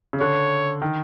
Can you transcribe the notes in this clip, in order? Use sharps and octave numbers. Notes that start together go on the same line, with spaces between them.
C#3
D3 C#5
D#3